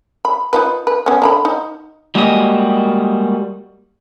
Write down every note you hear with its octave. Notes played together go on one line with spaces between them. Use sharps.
B5
D#4 F4 B4
B4
B3 C#4
D3 A#5 B5
D#4
G3 G#3 A#3 F#4 G4 D#5